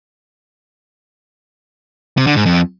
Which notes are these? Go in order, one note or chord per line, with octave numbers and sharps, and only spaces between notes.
C3
D3
G#2
F2